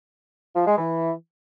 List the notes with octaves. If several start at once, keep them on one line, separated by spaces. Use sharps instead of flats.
F3
G#3
E3